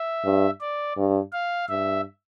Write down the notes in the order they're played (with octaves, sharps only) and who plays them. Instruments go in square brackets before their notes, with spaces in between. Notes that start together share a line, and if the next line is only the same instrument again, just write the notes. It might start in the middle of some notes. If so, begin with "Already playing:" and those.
Already playing: [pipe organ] E5
[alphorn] G2
[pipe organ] D5
[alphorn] G2
[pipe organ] F5
[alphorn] G2 [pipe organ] E5